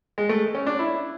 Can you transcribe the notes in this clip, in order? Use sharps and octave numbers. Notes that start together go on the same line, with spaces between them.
G#3
A3
C#4
D4
E4